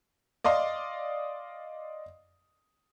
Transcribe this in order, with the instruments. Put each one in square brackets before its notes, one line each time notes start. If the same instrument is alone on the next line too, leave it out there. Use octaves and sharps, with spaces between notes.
[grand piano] D5 D#5 F5 C6